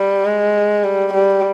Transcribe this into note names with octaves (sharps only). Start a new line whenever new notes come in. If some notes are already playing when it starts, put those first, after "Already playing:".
Already playing: G3
G#3
G3
G3